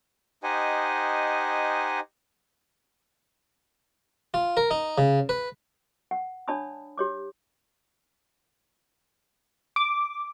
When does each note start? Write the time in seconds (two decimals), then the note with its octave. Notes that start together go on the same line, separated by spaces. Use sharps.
0.43 D#4 G4 C5 D#5 F#5 G#5
4.34 F4
4.57 A#4
4.71 D#4
4.98 C#3
5.29 B4
6.11 F#5
6.48 D4 C#5 D5 A5 B5 D#6
6.98 G4 C#5 D6
9.76 D6